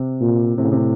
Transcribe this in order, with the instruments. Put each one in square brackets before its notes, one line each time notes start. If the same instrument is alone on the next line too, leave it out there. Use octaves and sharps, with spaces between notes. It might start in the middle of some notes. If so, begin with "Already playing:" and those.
Already playing: [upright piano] C3
[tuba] A#2
[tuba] A2 [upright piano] C3
[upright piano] C#3
C3